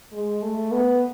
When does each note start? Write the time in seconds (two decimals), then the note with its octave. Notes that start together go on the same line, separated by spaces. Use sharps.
0.13 G#3
0.42 A3
0.72 B3